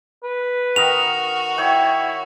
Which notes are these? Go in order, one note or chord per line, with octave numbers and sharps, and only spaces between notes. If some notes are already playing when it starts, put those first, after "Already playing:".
B4
D#3 F#4 A#4 D#5 F7
E4 C#5 G5